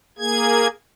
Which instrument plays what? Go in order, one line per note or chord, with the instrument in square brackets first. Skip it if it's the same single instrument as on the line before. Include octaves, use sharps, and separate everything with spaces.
[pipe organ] A#3 G#4 G#6